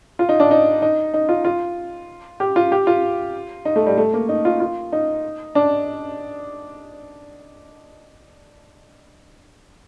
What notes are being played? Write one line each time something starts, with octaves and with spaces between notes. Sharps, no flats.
F4
D#4
D4
D#4
D#4
D#4
F4
F4
G4
F4
G4
F4
D#4
A3
G3
A3
A#3
D#4
F4
F4
D#4
D4